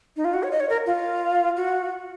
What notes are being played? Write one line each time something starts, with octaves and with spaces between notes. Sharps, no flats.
D#4
F4
F#4
C#5
D#5
C#5
A#4
F4
F#4